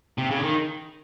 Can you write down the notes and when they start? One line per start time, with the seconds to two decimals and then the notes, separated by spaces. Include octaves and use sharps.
0.18 C3
0.31 C#3
0.38 D3
0.43 D#3